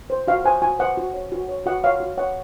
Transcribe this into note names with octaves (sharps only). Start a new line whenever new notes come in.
C5
F#4 F5
C5 G#5
F#4 G#5
C5 F#5
F#4
C#5
F#4
C#5
F#4 F#5
C#5 F5
F#4
C#5 F#5